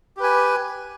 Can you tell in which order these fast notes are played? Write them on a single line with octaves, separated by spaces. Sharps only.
G4 B4 G#5